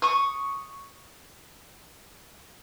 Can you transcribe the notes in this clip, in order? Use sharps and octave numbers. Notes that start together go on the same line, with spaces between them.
C#6 D#6